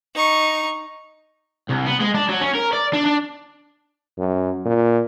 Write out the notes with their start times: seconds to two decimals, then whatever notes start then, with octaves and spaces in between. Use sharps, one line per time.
0.15 D#4 C#6
1.70 C2
1.87 B3
2.00 G#3
2.15 D4
2.29 F#3
2.41 C#4
2.55 A#4
2.73 D5
2.93 D4
3.06 D4
4.19 F#2
4.66 A#2